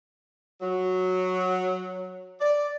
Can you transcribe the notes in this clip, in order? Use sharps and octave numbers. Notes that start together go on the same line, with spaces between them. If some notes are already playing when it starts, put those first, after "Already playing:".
F#3
D5